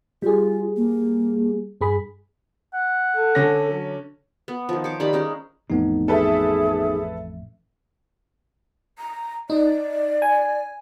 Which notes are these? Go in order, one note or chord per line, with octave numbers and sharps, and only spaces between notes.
G3 F4 G#4
A#3
G2 G#4 B5
F#5
A4
D3 C#4 A#6
F#3
B3
D#3 F3
C5 C#5 D6
D#3 G3 D5 B5
G#3 C#4 D#4
A1 F2 A2 B3 D#4
G#4 A4 B4 E5
A#5
D#4 D5
G#5